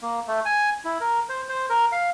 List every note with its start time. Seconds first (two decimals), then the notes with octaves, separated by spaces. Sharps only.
0.02 A#3
0.27 A3
0.45 G#5
0.85 E4
1.00 A#4
1.29 C5
1.49 C5
1.70 A#4
1.92 F5